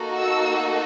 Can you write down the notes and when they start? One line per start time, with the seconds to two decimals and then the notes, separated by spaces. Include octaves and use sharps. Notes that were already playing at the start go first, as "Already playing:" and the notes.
Already playing: A#3 D#4 F#4 A4
0.19 E6